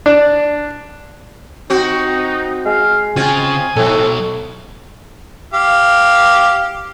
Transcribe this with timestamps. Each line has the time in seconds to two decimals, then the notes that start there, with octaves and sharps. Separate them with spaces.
0.06 D4
1.70 C4 D#4 F#4
2.66 G#3 F5
3.16 C#3 C4 F4 G#5
3.76 G#2 B2 F#3 A4
5.54 G4 F5